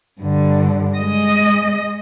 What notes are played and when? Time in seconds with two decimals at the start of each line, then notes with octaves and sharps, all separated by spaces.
0.21 G2 D3
0.98 G#3 D#5